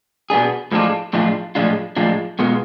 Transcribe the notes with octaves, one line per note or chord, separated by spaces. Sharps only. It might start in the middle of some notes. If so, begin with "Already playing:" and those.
B2 B3 D4 G#4
A2 F3 G#3 D4 F4
A2 F3 G#3 D4 F4
A2 F3 G#3 D4 F4
A2 F3 G#3 D4 F4
B2 G#3 B3 F4